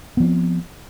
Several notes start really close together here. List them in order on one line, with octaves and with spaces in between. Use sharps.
B3 F3 C4